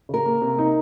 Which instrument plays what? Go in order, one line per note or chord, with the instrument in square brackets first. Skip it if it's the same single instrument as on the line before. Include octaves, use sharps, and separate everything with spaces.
[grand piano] C#3 [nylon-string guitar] A#4
[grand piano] A#3
C3
D#4